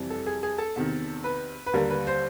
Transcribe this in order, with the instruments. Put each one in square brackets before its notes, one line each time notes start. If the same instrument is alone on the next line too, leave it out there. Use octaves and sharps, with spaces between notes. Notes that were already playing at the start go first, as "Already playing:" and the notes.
Already playing: [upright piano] F2 C3 E3 G3
A4
G#4
G#4
A4
E2 C3 D#3
B4
B4
D#2 D3 G3 A#4
B4
C5